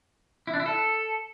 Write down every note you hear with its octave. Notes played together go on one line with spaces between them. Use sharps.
E4
D4
E4
A4